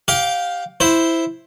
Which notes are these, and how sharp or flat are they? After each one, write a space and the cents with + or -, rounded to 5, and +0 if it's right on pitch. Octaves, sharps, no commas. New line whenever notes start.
G4 -15 F5 +15
E4 +0 C5 +0